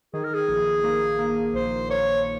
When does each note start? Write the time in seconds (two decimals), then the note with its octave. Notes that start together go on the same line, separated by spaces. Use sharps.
0.14 D#3 G#4
0.23 A#4
0.34 G#4
0.48 A#1
0.84 A#3
1.19 A#3
1.54 A#1 C5
1.90 A#3 C#5